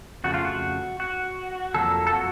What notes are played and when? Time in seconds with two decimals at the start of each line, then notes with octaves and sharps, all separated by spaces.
0.24 F2 C#3 A3 F#4
0.34 F4
0.45 F#4
1.00 F#4
1.74 F2 C3 F#3 A#3 A4
2.07 A4
2.13 F#4